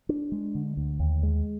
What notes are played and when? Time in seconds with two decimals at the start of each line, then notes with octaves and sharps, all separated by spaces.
0.09 D4
0.32 G#3
0.55 D3
0.77 D2
1.00 D#2
1.23 G#3